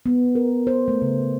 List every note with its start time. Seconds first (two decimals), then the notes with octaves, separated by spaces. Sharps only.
0.06 B3
0.35 A#4
0.67 C5
0.88 A3
1.02 C#3